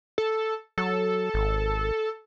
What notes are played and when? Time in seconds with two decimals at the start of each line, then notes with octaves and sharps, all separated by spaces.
0.18 A4
0.78 F#3 A4
1.34 G#1